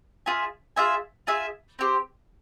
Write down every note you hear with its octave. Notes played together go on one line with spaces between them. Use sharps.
F4 G#4 E5 G#5
F4 G#4 E5 G#5
F4 G#4 E5 G#5
C4 G4 C5